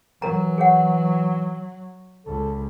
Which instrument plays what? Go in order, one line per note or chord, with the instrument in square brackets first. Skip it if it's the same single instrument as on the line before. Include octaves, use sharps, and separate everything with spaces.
[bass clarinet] E3 [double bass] F#3 [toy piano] A#4 A#5
[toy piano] G#4 C#5 F#5
[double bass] C#2 [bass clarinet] A4